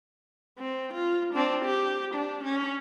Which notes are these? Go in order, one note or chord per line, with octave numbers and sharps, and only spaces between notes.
C4
F4
C4 D4
G4
D4
C#4